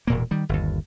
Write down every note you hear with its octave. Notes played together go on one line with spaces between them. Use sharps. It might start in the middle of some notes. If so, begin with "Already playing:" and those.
E1 A#2 A#3
D#3 G3
G1 D#2